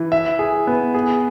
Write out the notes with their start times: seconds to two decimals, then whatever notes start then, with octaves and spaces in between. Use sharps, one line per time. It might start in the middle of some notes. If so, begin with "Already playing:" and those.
Already playing: E3
0.12 E5
0.39 G#4
0.67 B3
0.94 G#4